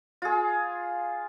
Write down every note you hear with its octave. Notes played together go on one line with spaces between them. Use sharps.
F4 G#4